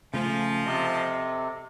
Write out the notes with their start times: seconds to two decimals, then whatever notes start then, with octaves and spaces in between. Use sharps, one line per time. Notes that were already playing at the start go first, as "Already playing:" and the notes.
0.14 C#3 F3 A3 G#5
0.66 C3 A4 D#5